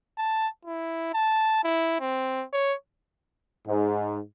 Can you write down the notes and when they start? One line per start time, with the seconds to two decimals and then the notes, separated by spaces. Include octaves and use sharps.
0.18 A5
0.65 E4
1.14 A5
1.64 E4
2.00 C4
2.53 C#5
3.67 G#2